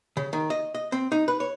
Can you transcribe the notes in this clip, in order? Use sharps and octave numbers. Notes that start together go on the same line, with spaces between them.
C#3
D#3
D#5
D#5
C4
D#4
B4
C#5